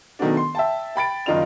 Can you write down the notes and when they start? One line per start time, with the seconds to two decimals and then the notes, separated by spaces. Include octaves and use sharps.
0.19 B2 D#3 F#3 A3 B3 D4
0.37 C6
0.55 E5 G5 A5
0.96 G5 B5 A6 D7
1.26 F#1 D#3 D#4 F4 D5 F7